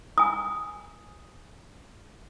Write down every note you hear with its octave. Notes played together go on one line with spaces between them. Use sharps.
G#5 D#6